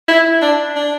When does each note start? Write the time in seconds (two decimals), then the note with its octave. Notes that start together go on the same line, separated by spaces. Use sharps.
0.08 E4
0.42 D4
0.76 D4